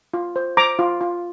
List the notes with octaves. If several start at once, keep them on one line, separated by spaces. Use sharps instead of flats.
F4
C5
C5 A#5 D6
F4
F4